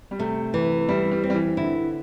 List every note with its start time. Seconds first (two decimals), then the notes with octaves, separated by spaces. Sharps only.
0.11 G3
0.19 C3 A3
0.54 E3
0.88 G3 E4
1.11 G3
1.23 C4
1.30 G3
1.34 E3
1.57 D3 E4